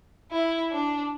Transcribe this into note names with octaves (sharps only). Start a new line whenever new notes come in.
E4
D4